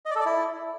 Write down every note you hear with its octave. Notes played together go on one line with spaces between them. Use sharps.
D#5
D5
A4
D5
E4